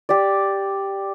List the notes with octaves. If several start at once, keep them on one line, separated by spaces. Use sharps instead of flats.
G4 D5